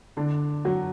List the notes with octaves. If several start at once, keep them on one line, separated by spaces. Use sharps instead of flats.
D3 D4
F#3 F#4